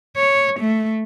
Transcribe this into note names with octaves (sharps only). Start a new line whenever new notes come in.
C#5
A3